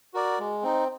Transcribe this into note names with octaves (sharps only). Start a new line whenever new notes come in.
F#4 A#4 D5
G#3
C4 D#4